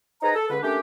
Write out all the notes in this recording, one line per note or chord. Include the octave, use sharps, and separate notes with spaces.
D#4 G#4 B4 C5 G#5 A#5
A4
C#2 D3 B4
A3 A#3 C#4 D4 G4